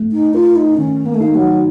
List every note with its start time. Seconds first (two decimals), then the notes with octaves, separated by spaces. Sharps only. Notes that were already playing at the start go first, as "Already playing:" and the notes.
Already playing: A3
0.12 D#4
0.34 F4 A#4
0.56 D#4
0.78 D#3 C#4
1.06 A#3
1.14 A3
1.21 A#3 D#4
1.35 F#3